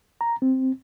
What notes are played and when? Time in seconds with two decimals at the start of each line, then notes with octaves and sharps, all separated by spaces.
0.21 A#5
0.42 C4